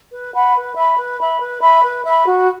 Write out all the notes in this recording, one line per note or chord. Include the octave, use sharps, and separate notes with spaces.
B4
F#5 B5
B4
E5 B5
B4
E5 B5
B4
E5 B5
B4
E5 B5
F#4